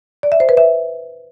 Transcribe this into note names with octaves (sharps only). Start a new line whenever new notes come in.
D5
E5
C5
B4
E5